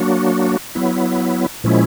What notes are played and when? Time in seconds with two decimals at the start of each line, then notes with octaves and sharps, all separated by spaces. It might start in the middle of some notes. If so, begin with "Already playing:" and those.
Already playing: F#3 A#3 D4 F#4
0.75 F#3 B3 E4
1.64 A#2 F3 G#3 C#4 E4